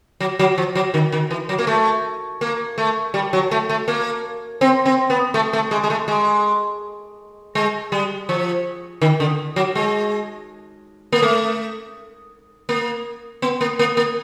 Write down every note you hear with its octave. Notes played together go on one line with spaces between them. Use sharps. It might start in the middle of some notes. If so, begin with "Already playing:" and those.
F#3
F#3
F3
F#3
D#3
D#3
E3
F#3
A#3
A3
A#3
A3
G3
F#3
A3
A3
A#3
C4
C4
B3
A3
A3
G#3
G#3
A3
G#3
G#3
G3
F3
D#3
D3
F#3
G#3
A#3
A3
A#3
B3
A#3
A#3
A#3